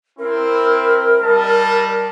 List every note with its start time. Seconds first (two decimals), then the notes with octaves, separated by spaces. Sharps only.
0.19 C4 E4 A#4
1.22 G3 D#5 A5